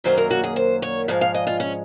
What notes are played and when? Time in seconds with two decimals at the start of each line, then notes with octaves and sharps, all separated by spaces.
0.04 F#2 D#3 F#3 A#3 C5
0.17 A#4
0.31 F#4
0.44 G#4
0.56 C5
0.82 C#5
1.08 G#2 F3 G#3 F5
1.21 F5
1.34 D#5
1.47 F4
1.60 C#4